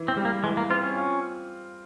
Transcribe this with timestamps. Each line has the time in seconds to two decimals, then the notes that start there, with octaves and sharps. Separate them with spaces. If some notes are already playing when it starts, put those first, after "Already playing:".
Already playing: E3
0.08 C4
0.17 G3
0.25 A#3
0.43 E3 G#3
0.57 A#3
0.70 C4 F4
0.83 C#4
0.96 F4